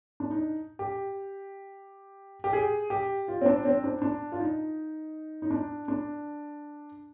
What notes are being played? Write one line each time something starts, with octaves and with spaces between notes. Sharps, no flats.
D4
D#4
G4
G4
G#4
G4
F4
C4
D4
C4
D4
D4
F4
D#4
D#4
D4
D4